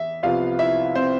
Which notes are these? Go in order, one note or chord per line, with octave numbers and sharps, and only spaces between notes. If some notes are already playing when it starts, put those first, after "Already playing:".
Already playing: E2 E5
C2 C3 F3 B3 F4 F5
E4 E5
C4 C5